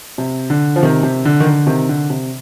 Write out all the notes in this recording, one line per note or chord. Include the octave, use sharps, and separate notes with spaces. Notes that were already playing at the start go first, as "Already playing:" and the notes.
C3
D3
F3
C3 D#3
C3
D3
D#3
D3
C3 D#3
D3
C3